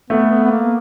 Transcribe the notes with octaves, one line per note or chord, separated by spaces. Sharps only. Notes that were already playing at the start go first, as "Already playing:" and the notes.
A3 B3
B3
B3
A#3